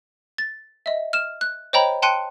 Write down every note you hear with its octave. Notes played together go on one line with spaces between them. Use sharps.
A6
D#5 E5
F6 E7
F#6
C5 C#5 D#5 G5 A#5 B5
G5 A5 C6 F#6 C#7 D#7